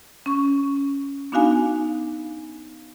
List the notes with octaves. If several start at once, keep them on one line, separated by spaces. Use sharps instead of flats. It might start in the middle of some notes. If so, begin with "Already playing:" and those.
C#4 C#6
B3 D4 D#4 F#4 F5 G#5